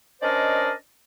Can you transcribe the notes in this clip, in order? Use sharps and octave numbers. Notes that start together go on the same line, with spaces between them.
C#4 D4 A#4 C5 D5 D#5